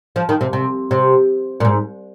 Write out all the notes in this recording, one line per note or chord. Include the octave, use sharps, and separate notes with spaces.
F3
D#3
C3
C3
C3
A#2
G#2